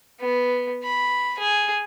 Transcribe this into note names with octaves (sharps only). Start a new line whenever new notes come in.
B3
B5
G#4